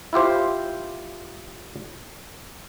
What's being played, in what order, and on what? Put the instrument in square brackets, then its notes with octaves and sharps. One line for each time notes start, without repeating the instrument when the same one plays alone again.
[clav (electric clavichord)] E4 F4 G4 C5